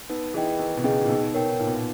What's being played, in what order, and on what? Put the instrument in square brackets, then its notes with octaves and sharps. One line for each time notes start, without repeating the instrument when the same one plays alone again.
[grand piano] B3 [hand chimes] D#4
[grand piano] E3 [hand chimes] G#4 D#5 G5
[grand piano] D#3 [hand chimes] D#4
[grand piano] B2
[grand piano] C#3 [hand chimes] G#4 D#5 G5
[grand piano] A#2
[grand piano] B2 [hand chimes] D#4
[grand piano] B2 [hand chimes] A#4 C#5 G5
[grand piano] A#2 [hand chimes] D#4
[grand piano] B2
A#2